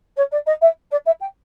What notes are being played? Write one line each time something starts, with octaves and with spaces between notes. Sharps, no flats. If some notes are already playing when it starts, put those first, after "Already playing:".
C#5
D5
D#5
E5
D5
E5
G5